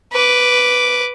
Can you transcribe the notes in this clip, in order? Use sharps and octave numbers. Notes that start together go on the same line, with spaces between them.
B4 D6